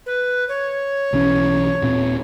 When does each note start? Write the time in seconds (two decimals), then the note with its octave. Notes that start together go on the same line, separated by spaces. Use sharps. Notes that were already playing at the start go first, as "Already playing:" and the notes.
0.06 B4
0.49 C#5
1.13 B1 E3 C#4
1.81 D#1 A#2 C4